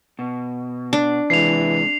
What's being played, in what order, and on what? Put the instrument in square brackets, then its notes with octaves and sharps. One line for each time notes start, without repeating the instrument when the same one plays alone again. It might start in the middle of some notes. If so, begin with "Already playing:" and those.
[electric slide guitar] B2
[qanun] D4
[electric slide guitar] C3 G#3 [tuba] E3 [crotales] C7 F7